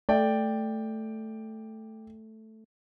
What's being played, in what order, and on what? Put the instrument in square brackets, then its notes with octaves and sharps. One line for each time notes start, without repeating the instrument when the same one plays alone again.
[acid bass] A3 [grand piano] D5 G5